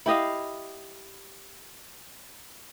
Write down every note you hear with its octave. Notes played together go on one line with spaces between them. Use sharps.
E4 G4 D#5 F5